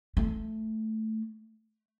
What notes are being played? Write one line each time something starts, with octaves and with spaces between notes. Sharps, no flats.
A3